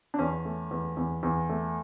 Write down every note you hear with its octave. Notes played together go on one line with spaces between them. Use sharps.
D4
E2 C#4
A3
E2
E2
E2
A3